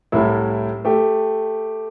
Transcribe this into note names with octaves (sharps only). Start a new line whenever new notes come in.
C2 A2 E4
A3 G4